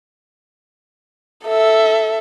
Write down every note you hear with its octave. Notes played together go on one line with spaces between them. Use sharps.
A4 E5